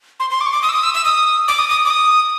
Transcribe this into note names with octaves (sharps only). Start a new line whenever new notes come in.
C6
C6
D6
C#6
D6
D#6
E6
D#6
E6
E6
D#6
D6
D#6
D#6
D6
D#6